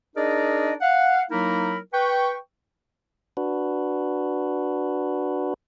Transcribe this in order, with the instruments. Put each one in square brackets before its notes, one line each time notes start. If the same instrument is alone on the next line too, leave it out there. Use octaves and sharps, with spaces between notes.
[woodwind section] D4 D#4 G#4 A#4 D5 D#5
F5 F#5
F#3 A#3 D#4 E4 A#4 B5
B4 G5 C#6
[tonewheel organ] D4 F#4 B4